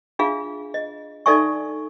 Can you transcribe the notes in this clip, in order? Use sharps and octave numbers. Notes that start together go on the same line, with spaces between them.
D4 F4 G#4 E5 F5
D#5
D#4 A4 D5 E5 G#5 C#6